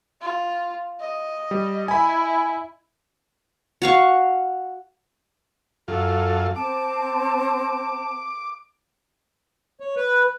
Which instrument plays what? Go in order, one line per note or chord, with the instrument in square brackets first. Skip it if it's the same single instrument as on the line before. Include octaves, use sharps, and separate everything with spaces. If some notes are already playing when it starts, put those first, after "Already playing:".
[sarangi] F4
D#5
[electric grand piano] G3
[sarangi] E4 [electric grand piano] G#5 B5
[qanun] F#4 F5 C#6
[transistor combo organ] F#2 F4 [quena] A4
[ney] C4 [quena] A5 [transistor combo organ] D6
[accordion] C#5
B4